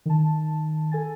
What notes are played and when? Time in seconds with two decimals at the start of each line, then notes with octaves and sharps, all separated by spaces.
0.06 D#3 A5
0.92 A4 G#5 A6